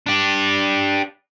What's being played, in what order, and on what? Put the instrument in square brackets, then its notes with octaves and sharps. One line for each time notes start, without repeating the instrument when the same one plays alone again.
[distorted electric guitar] D4 G4